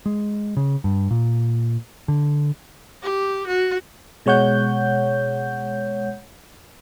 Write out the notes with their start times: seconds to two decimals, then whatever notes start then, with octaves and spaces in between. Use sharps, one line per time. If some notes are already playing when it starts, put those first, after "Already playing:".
0.06 G#3
0.57 C#3
0.84 G2
1.11 A#2
2.08 D3
3.03 G4
3.47 F#4
4.26 B2 G#3 C#5 F#5 G6